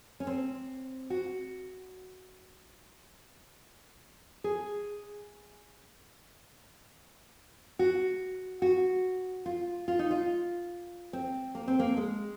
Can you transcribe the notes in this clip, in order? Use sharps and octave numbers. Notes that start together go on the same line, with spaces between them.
C#4
C4
F#4
G#4
F#4
F#4
F4
F4
D#4
F4
C4
A#3
C4
A#3
G#3